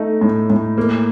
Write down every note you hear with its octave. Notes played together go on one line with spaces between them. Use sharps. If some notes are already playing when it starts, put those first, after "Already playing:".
Already playing: A3 D#4
A2
A2
A#3